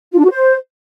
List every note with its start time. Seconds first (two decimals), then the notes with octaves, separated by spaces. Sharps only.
0.12 F4
0.18 D4
0.25 F#4
0.31 C5